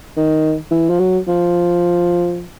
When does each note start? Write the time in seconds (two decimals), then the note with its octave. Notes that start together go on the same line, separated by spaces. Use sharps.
0.17 D#3
0.71 E3
0.90 F3
0.99 F#3
1.27 F3